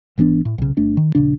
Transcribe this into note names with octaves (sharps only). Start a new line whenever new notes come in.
G#1 E3 B3 D4
A2
B1 C#3
G1 A3 D4
D#3
D#1 A#1 C#3 D4